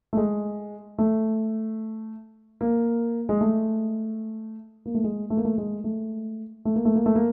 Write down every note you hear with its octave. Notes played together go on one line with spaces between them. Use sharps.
A3
G#3
A3
A#3
G#3
A3
A#3
A3
G#3
A3
A#3
A3
G#3
A3
A3
A#3
A3
A#3
A3
A#3